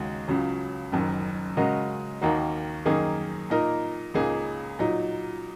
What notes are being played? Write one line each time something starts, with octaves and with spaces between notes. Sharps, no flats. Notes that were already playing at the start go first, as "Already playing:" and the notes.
Already playing: D#2 C#3 G#3 D#4 F#4
C#2 C#3 F#3
F#1 F#2 D#3
C#3 G#3 F#4 A#4 D#5
D#2 D#3 A#3 D#4 F#4
F#2 D#3 A#3 D#4 G#4
A#2 A#3 D#4 A#4
C#2 C#3 A#3 D#4 G#4
A#2 F#3 D#4